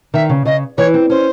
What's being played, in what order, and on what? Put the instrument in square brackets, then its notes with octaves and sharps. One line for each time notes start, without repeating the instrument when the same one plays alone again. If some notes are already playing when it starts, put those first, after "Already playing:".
[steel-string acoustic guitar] D#3 [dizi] E5
[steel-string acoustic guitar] C#3
[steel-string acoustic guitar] C#3 [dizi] D#5
[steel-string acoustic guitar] E3 [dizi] C#5
[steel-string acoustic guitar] C4
[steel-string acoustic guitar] C#4 [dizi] C5